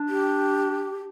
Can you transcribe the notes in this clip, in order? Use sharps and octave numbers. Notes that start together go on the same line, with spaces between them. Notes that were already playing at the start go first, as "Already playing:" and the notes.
Already playing: D4
G4